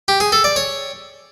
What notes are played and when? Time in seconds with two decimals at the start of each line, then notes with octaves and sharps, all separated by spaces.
0.08 G4
0.20 G#4
0.32 A4
0.44 D5
0.56 C#5